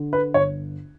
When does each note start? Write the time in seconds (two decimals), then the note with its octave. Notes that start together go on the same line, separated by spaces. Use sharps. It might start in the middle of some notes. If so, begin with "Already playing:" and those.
Already playing: D3
0.13 B4
0.34 G1 C#5